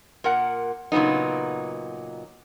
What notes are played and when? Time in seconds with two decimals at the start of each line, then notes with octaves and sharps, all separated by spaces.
0.24 A#2 A#4 F#5
0.92 A#2 C#3 F#3 B3 D#4